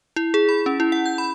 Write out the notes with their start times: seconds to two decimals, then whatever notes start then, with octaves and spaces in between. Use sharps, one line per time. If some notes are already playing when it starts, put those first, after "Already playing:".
0.16 E4
0.34 G#4
0.49 B5
0.66 C#4
0.80 E4
0.92 F#5
1.06 G6
1.18 B5